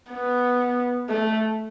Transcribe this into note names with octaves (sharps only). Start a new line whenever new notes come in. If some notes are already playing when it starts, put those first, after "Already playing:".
B3
A3